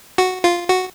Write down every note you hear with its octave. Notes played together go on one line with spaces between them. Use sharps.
F#4
F4
F#4